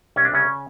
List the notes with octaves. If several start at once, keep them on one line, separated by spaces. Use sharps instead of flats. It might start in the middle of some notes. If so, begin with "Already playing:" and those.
C2 C#4
D4
C2 C#3 C#4